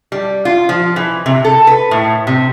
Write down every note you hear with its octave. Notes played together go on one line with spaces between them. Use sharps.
G3
F4
F3
E3
C3
A4
B4
A2
C3